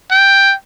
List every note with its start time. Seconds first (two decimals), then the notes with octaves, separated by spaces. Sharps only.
0.11 G5